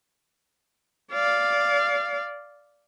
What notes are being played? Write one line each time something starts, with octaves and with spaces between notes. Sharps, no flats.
D5 F5